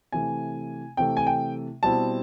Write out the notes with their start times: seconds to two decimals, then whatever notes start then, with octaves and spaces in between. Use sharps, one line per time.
0.12 C3 E3 A3 G#5
0.97 C3 E3 A3 G5
1.17 G#5
1.27 G5
1.83 B2 G3 C4 E4 A5